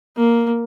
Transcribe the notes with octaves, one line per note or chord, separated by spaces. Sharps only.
A#3